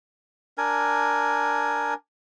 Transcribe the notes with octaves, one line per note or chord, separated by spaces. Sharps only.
D4 A#4 G#5